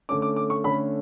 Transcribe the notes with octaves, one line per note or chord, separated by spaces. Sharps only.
D3 A3 C#4 D6
D6
D6
C#6
D3 A3 C#4 B5